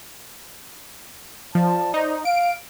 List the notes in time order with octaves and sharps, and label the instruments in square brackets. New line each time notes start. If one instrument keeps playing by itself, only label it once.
[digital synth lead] F3 [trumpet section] D5 A5
[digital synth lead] D#4 [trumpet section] C5 D5 A#5
[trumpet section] F5 [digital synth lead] D7